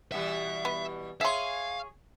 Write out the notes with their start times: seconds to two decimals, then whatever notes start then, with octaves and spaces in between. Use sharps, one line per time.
0.12 B2 E3 G3 E5
0.65 B3
1.21 G#4 C#5 E5 F5 C6